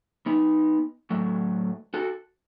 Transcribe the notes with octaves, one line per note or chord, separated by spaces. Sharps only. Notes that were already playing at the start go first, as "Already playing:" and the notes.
B3 D#4
A2 F#3 A3
F#4 A4